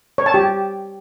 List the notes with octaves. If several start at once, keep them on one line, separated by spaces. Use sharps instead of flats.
C#5
A5
G4